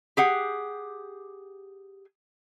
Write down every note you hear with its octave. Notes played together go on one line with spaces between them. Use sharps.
G4 G#4 F#5